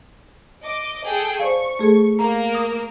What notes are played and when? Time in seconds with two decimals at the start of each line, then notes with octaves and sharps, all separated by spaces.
0.64 D#5 D6
1.04 G#4 A4 G5
1.39 C5 D5 F5 C#6
1.79 A3 G#4 A4
2.19 A#3 A#4 A#5
2.55 D#6